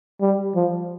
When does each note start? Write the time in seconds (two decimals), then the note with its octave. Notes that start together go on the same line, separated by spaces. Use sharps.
0.21 G3
0.55 F3